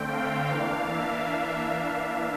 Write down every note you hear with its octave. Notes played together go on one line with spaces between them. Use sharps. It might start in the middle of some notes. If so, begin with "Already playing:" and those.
Already playing: D3 A3 C4 G5
F5
E3 A#3 D4 F5
E5